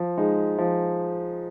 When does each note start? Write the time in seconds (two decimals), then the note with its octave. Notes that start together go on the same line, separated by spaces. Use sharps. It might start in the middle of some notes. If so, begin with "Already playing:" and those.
Already playing: F3
0.17 G#3 D#4
0.58 F3